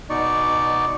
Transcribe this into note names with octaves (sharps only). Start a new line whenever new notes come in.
B2 D#4 D5 C#6